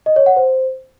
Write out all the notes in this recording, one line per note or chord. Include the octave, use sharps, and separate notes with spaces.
D#5
C#5
F#5
C5